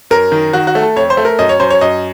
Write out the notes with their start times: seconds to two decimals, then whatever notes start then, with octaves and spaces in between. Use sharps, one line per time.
0.11 F#2 A#4
0.32 D#3
0.53 D#3 F#4
0.67 F#4
0.75 A3
0.82 A4
0.96 F2 C#5
1.10 C5
1.17 A3
1.25 A#4
1.39 F#2 D#5
1.49 C#5
1.60 F#2 C5
1.70 C#5
1.81 F#2 D#5